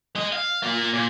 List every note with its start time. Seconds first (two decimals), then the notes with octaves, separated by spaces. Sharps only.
0.15 G#3 D#5
0.32 F5
0.63 A#3 F4
0.93 A#2